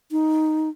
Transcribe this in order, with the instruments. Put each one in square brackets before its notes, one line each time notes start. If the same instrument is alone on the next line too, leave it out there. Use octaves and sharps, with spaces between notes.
[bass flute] D#4